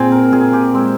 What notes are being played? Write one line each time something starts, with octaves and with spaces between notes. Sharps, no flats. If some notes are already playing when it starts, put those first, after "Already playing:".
Already playing: A#2 C4 G#4
A#4
A#2 G#4
G4
G#3 C4